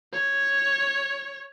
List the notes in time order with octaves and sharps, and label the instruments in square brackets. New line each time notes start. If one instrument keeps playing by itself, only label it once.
[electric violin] C#5